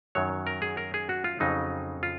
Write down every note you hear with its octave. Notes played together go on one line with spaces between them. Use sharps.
F#2 D#3 F#3 C#5
A#4
G#4
A#4
G#4
F#4
F4
F2 C#3 F#3 D#4
F4